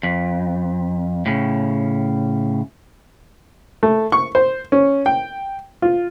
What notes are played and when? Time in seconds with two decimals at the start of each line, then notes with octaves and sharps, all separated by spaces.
0.03 F2
1.26 A2 C#3
3.83 A3
4.12 C#6
4.35 C5
4.72 C#4
5.06 G5
5.82 F4